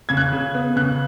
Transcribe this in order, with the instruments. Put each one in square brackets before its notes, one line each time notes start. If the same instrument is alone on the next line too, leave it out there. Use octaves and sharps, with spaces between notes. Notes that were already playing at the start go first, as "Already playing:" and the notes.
[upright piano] C#3 G#6
F#6
C#3
B3
C#3 F#6